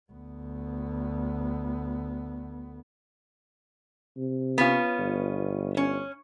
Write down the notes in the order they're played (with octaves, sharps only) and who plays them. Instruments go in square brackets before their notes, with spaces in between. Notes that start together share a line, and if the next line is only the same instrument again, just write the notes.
[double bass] D2 B3
[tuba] C3
[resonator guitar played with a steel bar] B3 C#4 F4
[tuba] G1
[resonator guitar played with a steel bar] C#4